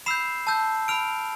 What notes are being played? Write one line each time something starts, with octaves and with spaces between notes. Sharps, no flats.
B5 E6 G6 C7 E7
A5 E6 G6
B5 F6 D7 F7